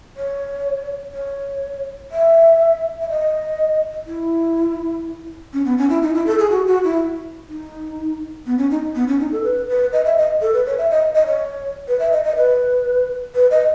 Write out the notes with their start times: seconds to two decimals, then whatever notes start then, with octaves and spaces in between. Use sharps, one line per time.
0.17 C#5
1.14 C#5
2.12 E5
3.01 E5
3.10 D#5
4.06 E4
5.53 C#4
5.65 B3
5.78 C#4
5.90 E4
6.02 D#4
6.14 E4
6.26 A4
6.39 G#4
6.51 F#4
6.67 F#4
6.84 E4
7.48 D#4
8.46 B3
8.58 C#4
8.71 D#4
8.95 B3
9.08 C#4
9.20 D#4
9.32 A4
9.44 B4
9.68 B4
9.93 D#5
10.05 E5
10.17 D#5
10.42 A4
10.53 B4
10.66 C#5
10.78 E5
10.91 D#5
11.15 D#5
11.27 C#5
11.88 B4
12.00 E5
12.12 D#5
12.25 D#5
12.37 B4
13.35 B4
13.51 D#5